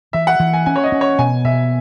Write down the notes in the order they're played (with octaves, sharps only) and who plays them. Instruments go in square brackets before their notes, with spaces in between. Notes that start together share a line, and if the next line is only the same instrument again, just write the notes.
[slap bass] E3 [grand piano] E5
[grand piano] F#5
[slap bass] E3
[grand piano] G#5
[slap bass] C#4 [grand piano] G#5
[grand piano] C#5
D#5
[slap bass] C#4
[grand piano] C#5
[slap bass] B2 [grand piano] G#5
[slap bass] B2 [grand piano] E5